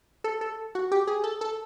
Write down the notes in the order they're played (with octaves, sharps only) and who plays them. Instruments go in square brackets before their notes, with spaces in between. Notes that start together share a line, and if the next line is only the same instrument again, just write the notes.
[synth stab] A4
A4
F#4
G4
G#4
A4
A4